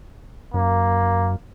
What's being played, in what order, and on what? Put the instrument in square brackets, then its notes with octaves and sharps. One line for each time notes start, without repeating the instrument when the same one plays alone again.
[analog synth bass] F#2 [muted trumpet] A#3